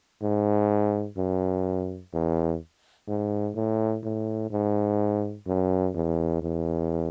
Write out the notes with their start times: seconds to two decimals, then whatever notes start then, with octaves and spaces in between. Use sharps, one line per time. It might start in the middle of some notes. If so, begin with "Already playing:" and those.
0.22 G#2
1.17 F#2
2.13 E2
3.08 G#2
3.56 A2
4.04 A2
4.51 G#2
5.47 F#2
5.94 E2
6.42 E2